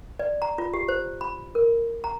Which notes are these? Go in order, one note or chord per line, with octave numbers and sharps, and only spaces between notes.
D5
A#5
F4
G4
C5
B5
A#4
A#5